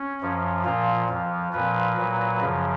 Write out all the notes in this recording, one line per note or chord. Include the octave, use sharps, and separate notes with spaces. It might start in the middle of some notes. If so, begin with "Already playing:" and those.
Already playing: C#4
F#2 F3
A#2 F3 F4
F2 F3
A#2 F3 B4
A#2 F#3
F#2 C#3 F3